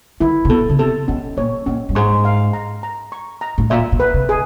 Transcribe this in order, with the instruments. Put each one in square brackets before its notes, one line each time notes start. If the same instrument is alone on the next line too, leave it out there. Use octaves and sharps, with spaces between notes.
[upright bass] D#3 [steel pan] E4
[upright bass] C3
[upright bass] B2 [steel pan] A4
[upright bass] C#3
[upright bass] C3 [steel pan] A4
[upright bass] B2 [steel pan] C#4
[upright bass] A#2 [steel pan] C#5
[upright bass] A#2 [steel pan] C#4
[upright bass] G2
[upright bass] G#2 [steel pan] C#6
[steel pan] F5
A#5
A#5
C#6
A#5
[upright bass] A2
[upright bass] A#2 [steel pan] E5
[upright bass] B2
[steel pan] B4
[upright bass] C3
[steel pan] G#4